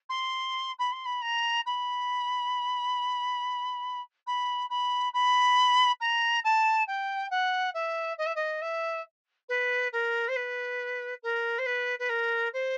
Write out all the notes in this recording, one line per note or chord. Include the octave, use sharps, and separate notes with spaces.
C6
B5
C6
B5
A#5
B5
B5
B5
B5
A#5
A5
G5
F#5
E5
D#5
E5
D#5
E5
B4
A#4
C5
B4
A#4
C5
B4
B4
A#4
C5